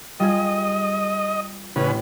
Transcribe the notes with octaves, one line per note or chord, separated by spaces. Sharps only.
G3 F4 G#4 D#5
A1 C#3 B4